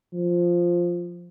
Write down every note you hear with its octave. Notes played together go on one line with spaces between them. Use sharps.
F3